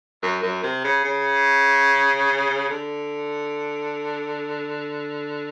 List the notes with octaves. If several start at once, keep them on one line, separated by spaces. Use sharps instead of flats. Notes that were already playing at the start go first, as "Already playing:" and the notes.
F#2
F#2
C3
C#3
C#3
D3